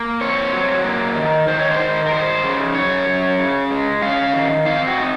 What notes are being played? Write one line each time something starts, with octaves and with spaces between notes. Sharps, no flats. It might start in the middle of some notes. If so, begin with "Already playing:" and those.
Already playing: A#3
C4 C#5
F#3
A#3
D#3
D#3 C5
C#5
C5
D#3
A#4
D#4 C5
C#3
F#2 C#5
F#2
C#3
G#3
C#4 F5
D#3
C4 F5
F#4
D#4